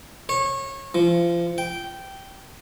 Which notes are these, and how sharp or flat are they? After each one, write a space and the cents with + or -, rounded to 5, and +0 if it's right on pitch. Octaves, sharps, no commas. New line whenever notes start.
C#5 -25
F3 -30
G5 -10